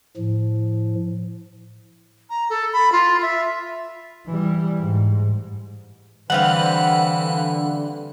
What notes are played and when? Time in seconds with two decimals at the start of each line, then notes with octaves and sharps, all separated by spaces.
0.17 A2 F3
2.30 A#5
2.50 A4
2.73 B5
2.92 F4
3.22 E5
4.27 E3 G3
4.78 G#2
6.30 D3 E3 G3 C4 B4 F5 F#5